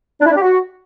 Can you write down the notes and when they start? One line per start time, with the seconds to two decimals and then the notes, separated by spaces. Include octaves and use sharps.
0.21 D4
0.26 E4
0.31 D4
0.36 G4
0.41 F#4